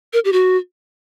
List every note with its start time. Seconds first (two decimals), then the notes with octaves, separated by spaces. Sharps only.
0.13 A#4
0.25 G4
0.33 F#4